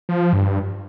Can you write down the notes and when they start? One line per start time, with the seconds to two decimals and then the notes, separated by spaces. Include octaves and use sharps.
0.09 F3
0.33 G2